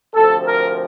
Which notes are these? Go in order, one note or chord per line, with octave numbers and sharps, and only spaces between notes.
D2 C3 F3 A4
A#4